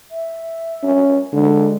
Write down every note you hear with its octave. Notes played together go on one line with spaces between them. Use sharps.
E5
C#4
D3 G#3